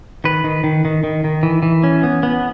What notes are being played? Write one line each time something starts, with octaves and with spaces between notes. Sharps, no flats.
D#3 B4
D#3
D#3
D#3
D#3
D#3
E3
E3
C#4
B3
B3